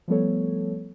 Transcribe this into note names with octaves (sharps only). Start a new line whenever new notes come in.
F3 G3 A3 B3 A4 C#5